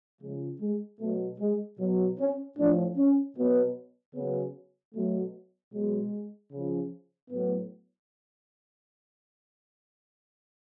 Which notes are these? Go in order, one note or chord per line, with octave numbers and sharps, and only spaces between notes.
C#3 F3 G#3
G#3
B2 F#3 A3
G#3
B2 F#3
C#4
A2 F3 D4
C#4
B2 F#3 B3
C#3 B3
F#3
B2 F#3 A3
B2 F#3 G#3
C#3 F3
A2 F#3 B3